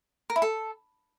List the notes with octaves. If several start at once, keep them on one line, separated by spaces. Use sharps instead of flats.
A#4
E4
A4